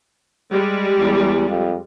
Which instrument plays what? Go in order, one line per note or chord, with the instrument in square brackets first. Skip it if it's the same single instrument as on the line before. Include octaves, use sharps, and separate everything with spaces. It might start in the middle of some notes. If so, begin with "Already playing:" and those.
[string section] G3 G#3
[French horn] E2
F2